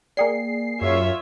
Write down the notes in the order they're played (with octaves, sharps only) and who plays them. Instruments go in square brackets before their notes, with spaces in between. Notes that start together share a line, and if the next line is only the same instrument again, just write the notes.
[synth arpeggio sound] A#3 G#4 C7 [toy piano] D5 G5
[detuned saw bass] F#2 [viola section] F4 C#5 E5